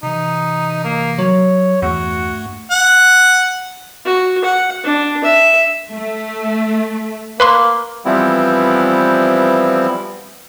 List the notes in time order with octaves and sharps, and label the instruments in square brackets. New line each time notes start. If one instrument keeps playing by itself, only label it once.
[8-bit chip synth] C3 E3 [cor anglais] D#4
[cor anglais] A#3
[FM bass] F#3 [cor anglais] C#5
[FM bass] E2 [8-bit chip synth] G2 A3 [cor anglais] F#4
[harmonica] F#5
[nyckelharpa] F#4
F#5
D4
E5
[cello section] A3
[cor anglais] A#3 [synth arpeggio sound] B4 B5 C6
[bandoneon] E3 F3 G3 B3 C4 E4